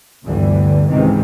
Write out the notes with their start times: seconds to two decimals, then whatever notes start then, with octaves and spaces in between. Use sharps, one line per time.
0.25 G1 D2 G2 D3 E3
0.88 C#2 G#2 C3 D#3 E3